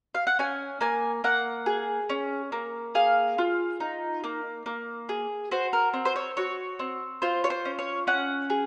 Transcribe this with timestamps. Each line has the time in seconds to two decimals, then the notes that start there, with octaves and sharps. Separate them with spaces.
0.15 F5
0.27 F#5
0.39 C#4 G#5
0.81 A#3 G#5
1.24 A#3 F#5
1.66 G#4
2.09 C#4
2.52 A#3
2.95 G#4 F5
3.38 F4
3.80 D#4
4.24 A#3
4.66 A#3
5.09 G#4
5.51 F#4 C5
5.73 A#4
5.93 C4
6.05 C5
6.16 C#5
6.37 F#4 C#5
6.79 C4
7.22 F4 C5
7.44 C#5
7.50 C5
7.65 C#4
7.79 C#5
8.07 C#4 F#5
8.50 G#4